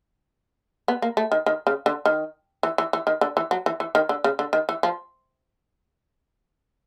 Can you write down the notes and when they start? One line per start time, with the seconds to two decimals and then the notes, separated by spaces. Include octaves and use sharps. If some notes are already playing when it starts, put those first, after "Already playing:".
0.88 B3
1.02 A#3
1.17 A3
1.32 D#3
1.46 D#3
1.67 C#3
1.86 D3
2.06 D#3
2.63 E3
2.78 E3
2.93 E3
3.07 D#3
3.21 D3
3.37 E3
3.51 F#3
3.66 E3
3.80 E3
3.95 D#3
4.09 D3
4.24 C#3
4.39 D3
4.53 D#3
4.69 E3
4.83 F3